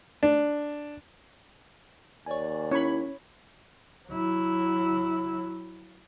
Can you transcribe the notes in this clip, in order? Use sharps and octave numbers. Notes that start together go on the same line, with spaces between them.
D4
D#2 C#5 D5 G#5
C#4 E4 C#5 B5
F#3 E4